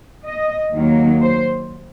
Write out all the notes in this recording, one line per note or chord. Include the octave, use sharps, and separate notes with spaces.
D#5
D#2 D#3 F#3 A#3
C5